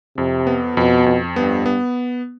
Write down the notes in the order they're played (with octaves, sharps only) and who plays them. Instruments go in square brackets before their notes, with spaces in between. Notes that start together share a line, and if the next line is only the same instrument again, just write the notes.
[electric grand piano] F2 [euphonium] C3
[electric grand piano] B3
[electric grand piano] F2 [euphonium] B2
[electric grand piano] F2
[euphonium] G2 [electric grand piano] B3
[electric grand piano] B3